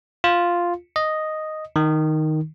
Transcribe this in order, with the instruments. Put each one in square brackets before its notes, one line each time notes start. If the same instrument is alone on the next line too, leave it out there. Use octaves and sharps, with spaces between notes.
[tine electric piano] F4
D#5
D#3